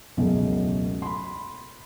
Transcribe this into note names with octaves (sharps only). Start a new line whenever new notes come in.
E1 C#2 F#2 B2 F#3 A3
B5 C6